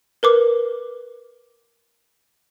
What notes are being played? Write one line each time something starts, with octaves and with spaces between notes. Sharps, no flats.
A#4 B4 D6